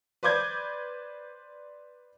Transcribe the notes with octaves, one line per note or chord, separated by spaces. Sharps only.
B4 C5 D5 D6 G6 G#6